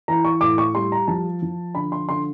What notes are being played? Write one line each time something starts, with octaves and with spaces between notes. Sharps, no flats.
E3 A#5
C#6
A2 D6
C#6
G3 C6
A#5
F3 A5
F3
D3 B5
C6
D3 C6